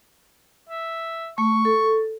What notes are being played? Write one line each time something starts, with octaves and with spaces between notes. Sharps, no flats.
E5
A3 C#6
A4